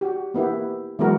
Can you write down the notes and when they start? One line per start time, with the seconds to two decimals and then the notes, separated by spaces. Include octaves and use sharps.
0.01 F#4 G4
0.34 A#3 B3 E4 G4
0.99 E3 F#3 G#3 B3 F#4 A#4